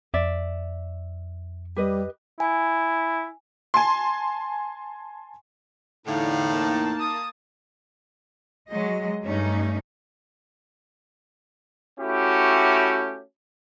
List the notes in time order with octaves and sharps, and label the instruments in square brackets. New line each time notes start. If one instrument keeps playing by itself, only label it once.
[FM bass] F2 [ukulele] D5 E5
[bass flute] G3 [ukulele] G4 B4 D#5
[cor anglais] E4 [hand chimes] G#5
[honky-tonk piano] G#5 A5 C6
[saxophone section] E2 A2 [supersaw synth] D3 [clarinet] D#4 [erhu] F5
[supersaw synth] A#3 A5
[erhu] D#6
[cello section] F#3 G#3 D#5
G2 A3 C#4 D#4
[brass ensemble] A3 C#4 E4 F#4 G4